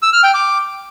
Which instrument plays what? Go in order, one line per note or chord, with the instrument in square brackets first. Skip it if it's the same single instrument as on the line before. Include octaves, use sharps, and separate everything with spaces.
[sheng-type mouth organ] E6
F6
G5
D6